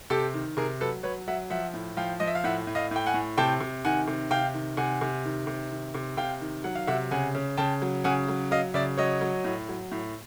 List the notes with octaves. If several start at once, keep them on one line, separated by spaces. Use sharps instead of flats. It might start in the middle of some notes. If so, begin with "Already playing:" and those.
C3 G4 A4
D#3
C3 G#4 A#4
F#3 A4 B4
F#3 B4 C#5
F#3 E5 F#5
F3 E5 F#5
A2
F3 F5 G5
F3 D#5
E5
F5
A2 E5 F#5
A2
D#5 F5
A2 G5
F#5 G#5
A2
C3 G5 A5
C3
D#3 F#5 G#5
C3
C3 F5 G5
D#3
C3 F#5 G#5
C3
D#3
C3
D#3
C3
C3 F5 G5
D#3
F#3 F#5
F5
C3 E5 F#5
C#3 F#5 G#5
C#3
C#3 G5 A5
F#3
C#3 F#5 G#5
F#3
F#3 D#5 F5
C#3 D5 E5
F#3 C#5 D#5
F#3
A2
F#3
A2